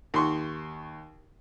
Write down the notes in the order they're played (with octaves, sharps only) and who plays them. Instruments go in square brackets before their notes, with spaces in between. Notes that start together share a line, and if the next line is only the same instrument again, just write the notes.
[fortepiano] D#2 C6 C#6